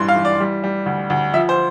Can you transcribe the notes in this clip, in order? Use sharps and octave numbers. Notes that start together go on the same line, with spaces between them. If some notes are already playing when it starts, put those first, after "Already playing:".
Already playing: A1 G2 E3 C6
F5
E3
D5
G3
G3
D2
D2
F3 E5
C5